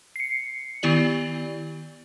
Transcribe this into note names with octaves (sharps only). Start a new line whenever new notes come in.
C7 C#7
D#3 B3 E4 G4 D5 F#7